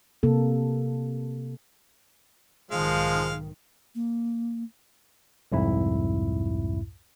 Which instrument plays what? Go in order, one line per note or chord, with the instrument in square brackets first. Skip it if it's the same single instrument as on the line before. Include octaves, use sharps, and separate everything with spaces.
[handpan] C3 A#3 A4
[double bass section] B1 G#2 D#3 [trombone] F3 [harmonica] G#3 F5
[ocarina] A#3
[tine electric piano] C2 F2 G#2 E4